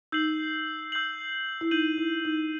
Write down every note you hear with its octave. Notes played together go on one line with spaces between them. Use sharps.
D#4 E6 G6 C7 F#7
E6 G6 C7 F#7
E4
D#4 G6 D#7 F#7
E4
D#4